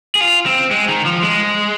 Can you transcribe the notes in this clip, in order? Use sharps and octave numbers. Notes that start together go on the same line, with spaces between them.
G#4
F4
C4
G#3
D#3
F3
G#3